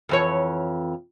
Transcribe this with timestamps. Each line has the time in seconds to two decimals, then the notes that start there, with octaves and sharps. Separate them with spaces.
0.09 F2 E3 C#5